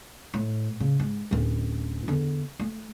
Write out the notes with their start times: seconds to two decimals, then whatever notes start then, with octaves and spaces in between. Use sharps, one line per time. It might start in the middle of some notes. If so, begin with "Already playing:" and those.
0.34 A2
0.80 C#3
1.00 G#2
1.31 D1 C#4
2.08 E2 D3
2.59 A3